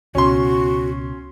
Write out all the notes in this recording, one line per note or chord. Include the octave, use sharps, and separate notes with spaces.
C#2 B2 C#4 F#4 C6